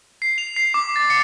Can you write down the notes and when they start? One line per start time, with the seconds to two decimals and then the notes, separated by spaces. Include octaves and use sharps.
0.22 C7
0.38 F7
0.56 C7
0.74 D6
0.96 A6
1.10 C#7